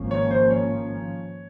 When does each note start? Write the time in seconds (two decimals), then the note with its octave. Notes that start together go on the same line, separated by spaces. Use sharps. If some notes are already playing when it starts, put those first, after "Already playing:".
Already playing: G#1 G#2 F3 A#3 C#4
0.11 C#5
0.31 C5
0.50 C#5